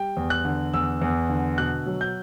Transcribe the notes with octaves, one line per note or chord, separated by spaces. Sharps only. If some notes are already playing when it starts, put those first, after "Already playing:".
Already playing: G3 G5
E2
F#6
D3
E2 E6
E2
D3
B2 F#6
F#3
G6